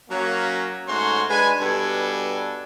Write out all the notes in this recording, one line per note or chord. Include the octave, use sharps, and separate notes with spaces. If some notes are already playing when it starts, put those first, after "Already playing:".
F#3 A#3 C#4
G#2 A3 C#4 F#4 C#5 C6
G#3 D4 B4 G#5
G2 B2 G3 D4 A4 G#5